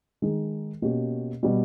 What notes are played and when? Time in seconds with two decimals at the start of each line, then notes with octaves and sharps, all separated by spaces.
0.22 D#3 G#3 D#4 G#4
0.82 B2 A#3 C#4 G4
1.43 B2 G3 B3